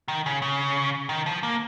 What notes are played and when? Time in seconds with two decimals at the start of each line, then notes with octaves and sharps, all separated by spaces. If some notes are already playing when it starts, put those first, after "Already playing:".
0.08 D#3
0.26 C#3
0.42 C#3
1.09 D#3
1.26 F3
1.43 A#3